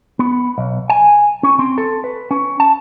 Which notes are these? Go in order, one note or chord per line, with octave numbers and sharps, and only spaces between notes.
B3
B1
G#5
C#4
C4
A4
B4
C#4
A5